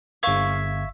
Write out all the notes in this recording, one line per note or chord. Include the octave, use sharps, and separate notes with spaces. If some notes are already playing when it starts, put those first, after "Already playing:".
G1 E5 F5 C#6 G#6